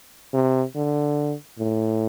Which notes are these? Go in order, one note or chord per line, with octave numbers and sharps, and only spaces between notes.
C3
D3
A2